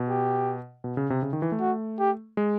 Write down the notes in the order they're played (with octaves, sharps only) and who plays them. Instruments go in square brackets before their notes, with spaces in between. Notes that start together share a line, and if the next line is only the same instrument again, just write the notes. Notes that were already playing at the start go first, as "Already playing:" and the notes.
Already playing: [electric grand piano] B2
[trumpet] G4
[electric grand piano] B2
C#3
C3
C#3
D#3
E3
A3
[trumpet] F#4
G4
[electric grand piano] G#3